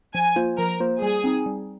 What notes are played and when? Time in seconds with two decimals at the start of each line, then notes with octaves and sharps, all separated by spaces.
0.14 F3 G#5
0.36 A#3 F4 C5
0.58 F3 A#4
0.80 A#3 F4 C5
1.02 G3 G#4
1.24 C4 D#4
1.46 G3